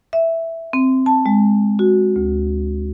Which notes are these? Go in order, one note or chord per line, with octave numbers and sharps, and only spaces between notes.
E5
C4
A5
G#3
F#4
D2